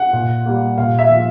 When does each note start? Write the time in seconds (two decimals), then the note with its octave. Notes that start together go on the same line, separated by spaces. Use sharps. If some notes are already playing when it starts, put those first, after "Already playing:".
Already playing: F#5
0.13 A#2
0.46 G3 A#3
0.78 A#2 F5
0.98 E5
1.09 F3 A#3